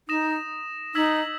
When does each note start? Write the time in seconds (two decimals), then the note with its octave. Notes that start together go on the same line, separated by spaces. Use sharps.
0.08 D#4 D#6 A#6 E7
0.95 D#4 E6 G#6 B6 F#7